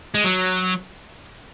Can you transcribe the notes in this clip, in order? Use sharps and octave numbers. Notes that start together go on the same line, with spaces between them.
G#3
F#3